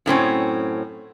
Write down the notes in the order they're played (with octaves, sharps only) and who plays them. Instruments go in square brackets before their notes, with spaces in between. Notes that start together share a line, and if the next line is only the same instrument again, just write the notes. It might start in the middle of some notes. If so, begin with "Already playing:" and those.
[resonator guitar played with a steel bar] F#2 A2 C4 C#4